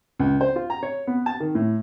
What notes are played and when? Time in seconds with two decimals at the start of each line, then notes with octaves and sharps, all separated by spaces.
0.20 C#2
0.41 C5
0.56 F4
0.70 A#5
0.83 C#5
1.07 B3
1.26 A5
1.40 D#3
1.55 A2